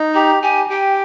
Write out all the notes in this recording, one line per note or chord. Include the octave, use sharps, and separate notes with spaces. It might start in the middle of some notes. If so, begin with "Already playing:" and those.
Already playing: D#4
G4 A#5
G4 G#5
G4 G5